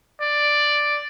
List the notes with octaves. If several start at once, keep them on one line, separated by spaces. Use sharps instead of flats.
D5